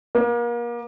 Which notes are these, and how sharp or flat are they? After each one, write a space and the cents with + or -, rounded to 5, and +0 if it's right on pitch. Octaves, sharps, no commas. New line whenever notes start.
A#3 +35